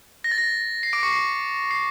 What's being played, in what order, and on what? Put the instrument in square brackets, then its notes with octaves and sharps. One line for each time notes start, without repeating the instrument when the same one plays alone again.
[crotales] A#6
A6
A#6
C7
D6 D7
C#6 C#7
C7
C7